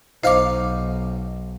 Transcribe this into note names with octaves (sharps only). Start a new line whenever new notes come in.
B1 D#4 C5 F5 D6